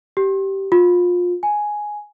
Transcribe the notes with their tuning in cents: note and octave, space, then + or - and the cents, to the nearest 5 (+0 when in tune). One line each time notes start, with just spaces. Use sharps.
G4 -15
F4 +25
G#5 +5